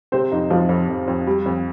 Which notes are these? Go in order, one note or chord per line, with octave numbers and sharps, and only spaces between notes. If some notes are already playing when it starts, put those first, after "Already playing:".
C3 C4 C5
F2 D#4
F2 F3 F4
F2
F2
F2
G3
F2